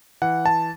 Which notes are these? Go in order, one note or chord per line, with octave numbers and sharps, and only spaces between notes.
E3 F#5
A5